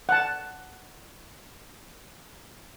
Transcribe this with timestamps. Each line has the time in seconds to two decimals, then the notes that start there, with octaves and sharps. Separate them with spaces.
0.09 F#5 A5